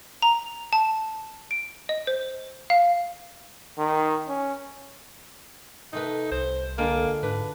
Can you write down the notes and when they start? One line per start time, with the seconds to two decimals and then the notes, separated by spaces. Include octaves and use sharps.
0.22 A#5
0.73 A5
1.51 D7
1.89 D#5
2.07 C5
2.70 F5
3.78 D#3
4.28 C#4
5.93 C3 A3 D#4 B4
6.31 C2 C5
6.78 D3 G#3 A#3 F4
7.23 G#2 D4 B4